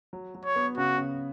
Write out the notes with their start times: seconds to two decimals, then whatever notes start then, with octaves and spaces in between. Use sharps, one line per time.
0.13 F#3
0.35 F#3
0.45 C#5
0.56 B3
0.77 C#3 F#4
0.98 C#3